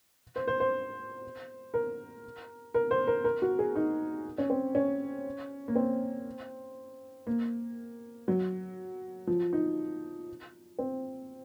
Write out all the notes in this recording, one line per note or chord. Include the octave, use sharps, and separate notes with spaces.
C5
C5
C5
A#4
A#4
C5
A#4
A#4
F#4
G#4
D#4
C#4
C4
C#4
A#3
C4
A#3
F#3
F3
D#4
C4